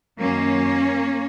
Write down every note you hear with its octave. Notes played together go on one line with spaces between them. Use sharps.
F#2 D#3 F#3 A#3 C#4